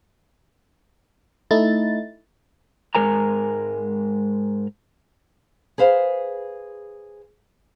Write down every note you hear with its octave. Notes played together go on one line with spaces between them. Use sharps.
A3 D#4 E4 A6
G#2 G#3 A#4 G#5 A#5
G#4 B4 C5 F5